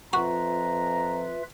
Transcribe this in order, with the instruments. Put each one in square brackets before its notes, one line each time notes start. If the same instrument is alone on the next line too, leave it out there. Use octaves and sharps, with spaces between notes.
[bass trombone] F2 [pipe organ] F4 B4 E5 [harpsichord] F#4 [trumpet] A#5